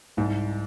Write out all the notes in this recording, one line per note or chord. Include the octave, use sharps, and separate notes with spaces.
C2 G#2